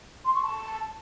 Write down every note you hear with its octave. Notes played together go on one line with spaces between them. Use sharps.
C6
C#6
A5